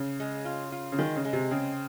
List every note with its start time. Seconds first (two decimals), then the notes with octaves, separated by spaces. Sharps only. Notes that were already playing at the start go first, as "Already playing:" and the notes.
Already playing: C#3
0.20 G#3
0.45 F4
0.72 F4
0.92 C#3
0.98 D#3 G#3
1.16 C#3
1.25 G#3
1.33 C3
1.51 C#3 C4